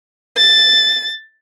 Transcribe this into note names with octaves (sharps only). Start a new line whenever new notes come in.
A6